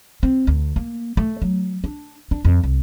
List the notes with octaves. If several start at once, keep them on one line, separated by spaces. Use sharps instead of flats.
C4
D2
A#3
A3
F#3
D4
D4
F2
C2